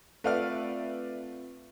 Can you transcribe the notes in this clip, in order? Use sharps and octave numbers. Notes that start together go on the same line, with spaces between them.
A3 C4 F4 B4 D5 E5 F5 F6